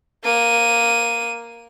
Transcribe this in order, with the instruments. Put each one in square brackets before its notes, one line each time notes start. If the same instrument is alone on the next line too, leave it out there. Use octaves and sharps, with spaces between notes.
[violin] A#3 D#7